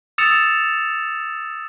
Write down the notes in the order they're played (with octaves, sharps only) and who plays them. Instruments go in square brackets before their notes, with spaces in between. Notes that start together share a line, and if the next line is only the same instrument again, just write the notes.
[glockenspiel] D#6 E6 A6 C#7 E7 F7